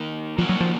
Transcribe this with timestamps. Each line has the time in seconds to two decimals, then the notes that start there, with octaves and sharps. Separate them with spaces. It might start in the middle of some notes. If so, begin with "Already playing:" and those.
Already playing: D#3 A#3 D#4 A#4
0.38 D#3 F3 A#3 C#4 F#4
0.49 F#3
0.60 F3